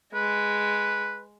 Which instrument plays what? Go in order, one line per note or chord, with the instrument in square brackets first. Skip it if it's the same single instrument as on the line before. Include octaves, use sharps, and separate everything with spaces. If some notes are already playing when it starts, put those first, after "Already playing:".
[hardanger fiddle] G#3 [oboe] B4